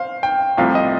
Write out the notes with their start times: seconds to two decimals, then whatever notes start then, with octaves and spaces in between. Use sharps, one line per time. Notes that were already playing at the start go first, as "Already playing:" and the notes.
Already playing: C5 F5
0.23 G5
0.57 C2 C3 F3 A3 F5
0.75 D#5